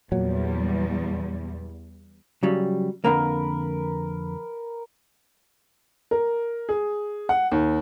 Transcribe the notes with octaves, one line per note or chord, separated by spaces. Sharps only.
E2 A#2 F#3 G3
C#3 F#3 G3
F2 D3 A#3 A#4 B4
A#4
G#4
F#5
D#2